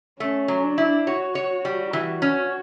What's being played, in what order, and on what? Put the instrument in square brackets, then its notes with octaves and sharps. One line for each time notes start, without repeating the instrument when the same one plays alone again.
[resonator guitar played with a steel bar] A3 [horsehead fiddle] C#4
[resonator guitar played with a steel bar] F#3
[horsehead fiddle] D4
[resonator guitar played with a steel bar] E4
[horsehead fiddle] F#4 [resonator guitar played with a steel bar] C#5
[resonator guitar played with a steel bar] C#5
G3
[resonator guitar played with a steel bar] E3 [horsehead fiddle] F#4
[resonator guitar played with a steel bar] C#4